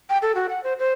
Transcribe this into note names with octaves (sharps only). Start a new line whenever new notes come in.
G5
A4
F#4
F#5
C5
C5